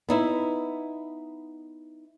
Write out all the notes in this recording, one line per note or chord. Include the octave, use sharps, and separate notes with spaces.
B3 D#4 E4